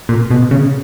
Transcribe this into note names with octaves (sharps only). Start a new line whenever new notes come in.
A#2
B2
C#3